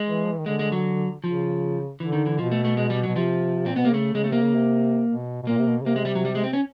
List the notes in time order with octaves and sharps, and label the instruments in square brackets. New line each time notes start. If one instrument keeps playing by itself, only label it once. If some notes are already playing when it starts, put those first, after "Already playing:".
Already playing: [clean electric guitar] G#3
[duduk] E3
F3
E3
D#3
[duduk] D3 [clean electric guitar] G#3
[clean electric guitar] G#3
F#3
[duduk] C#3 [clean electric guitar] F3
[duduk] D3 [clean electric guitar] E3
[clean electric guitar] D#3
E3
[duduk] B2 [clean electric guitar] F3
[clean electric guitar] A3
A3
G#3
G3
[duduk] B2 [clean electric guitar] F#3
[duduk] C3 [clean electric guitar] F3
[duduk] A#2 [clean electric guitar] C4
[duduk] B2 [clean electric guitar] B3
[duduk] C3 [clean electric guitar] A#3
[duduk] C#3 [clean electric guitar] A3
[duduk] C#3 [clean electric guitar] G#3
[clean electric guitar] A3
[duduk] C3 [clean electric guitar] A#3
[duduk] C#3
C3
B2
B2
[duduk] A#2 [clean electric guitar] A#3
[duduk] C3
B2
C#3
[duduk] C3 [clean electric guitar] A#3
[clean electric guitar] G#3
G3
F#3
G3
G#3
C4
C#4